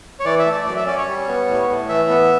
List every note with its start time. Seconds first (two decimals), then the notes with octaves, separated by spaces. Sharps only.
0.20 C#5
0.25 E3 D5
0.39 E5
0.46 A3
0.52 D5
0.66 F#2 D5
0.77 E5
0.86 C#4 D5
0.98 C#5
1.08 G3
1.28 B3
1.48 A2
1.69 A2
1.89 E3 E5
2.09 B3